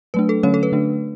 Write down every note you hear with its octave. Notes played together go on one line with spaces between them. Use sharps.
F#3 A3 D4 B4
A4
D3 F#3 A3 C#4 C#5
A4
B4
D3 A3 D4